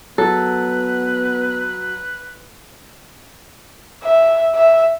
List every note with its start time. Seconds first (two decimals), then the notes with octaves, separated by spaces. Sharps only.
0.18 F#3 B3 A4 B4
4.03 E5
4.55 E5